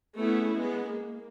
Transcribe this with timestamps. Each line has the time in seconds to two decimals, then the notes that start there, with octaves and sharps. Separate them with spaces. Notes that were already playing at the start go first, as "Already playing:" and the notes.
0.19 A3 B3 C#4 E4 G#4
0.55 G#3 B3
0.89 A#3